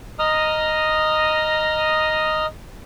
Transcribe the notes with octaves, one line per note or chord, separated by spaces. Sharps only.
D#5 A#5 D#6 F6